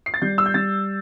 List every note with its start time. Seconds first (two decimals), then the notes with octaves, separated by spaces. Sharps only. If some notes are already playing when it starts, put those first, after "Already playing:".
0.06 C7
0.14 A6
0.22 G3 G6
0.38 E6
0.46 G6
0.54 G3 A6